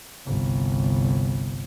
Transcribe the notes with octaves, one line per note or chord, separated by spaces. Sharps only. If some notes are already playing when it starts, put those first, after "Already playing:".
G1 C2